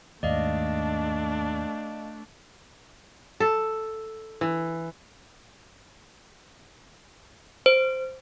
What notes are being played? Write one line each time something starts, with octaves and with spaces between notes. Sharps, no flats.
D#2 G#2 A3 D4 D5 D#5 F5
A4
E3
C5